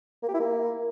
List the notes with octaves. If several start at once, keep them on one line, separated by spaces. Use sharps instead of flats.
A#3
G4
E4
A#3